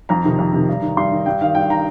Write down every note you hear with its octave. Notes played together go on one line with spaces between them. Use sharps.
F2 A#5
C3 D#3
F2
C3 D#3
G2
D#3
G2 C6
D#3
G2 G5
D#3 F5
G2 G5
D#3 A#5